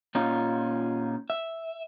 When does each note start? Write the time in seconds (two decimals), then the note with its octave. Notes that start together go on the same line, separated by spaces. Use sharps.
0.15 A#2 C#4 D#4 F4
1.30 E5